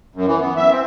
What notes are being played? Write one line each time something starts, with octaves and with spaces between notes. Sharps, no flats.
F#2
E3
B3
E5
C4